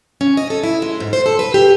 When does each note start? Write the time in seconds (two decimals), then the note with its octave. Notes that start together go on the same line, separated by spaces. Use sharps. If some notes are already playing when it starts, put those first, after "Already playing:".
0.21 C#4
0.37 D#5
0.50 A4
0.64 E4
0.82 G#3
1.00 G#2
1.13 C5
1.26 A4
1.39 B4
1.54 G4